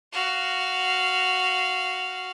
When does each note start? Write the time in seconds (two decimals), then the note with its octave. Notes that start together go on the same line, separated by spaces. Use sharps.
0.12 F#4 F5